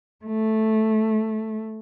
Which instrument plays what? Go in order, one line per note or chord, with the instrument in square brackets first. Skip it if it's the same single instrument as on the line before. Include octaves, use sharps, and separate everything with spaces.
[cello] A3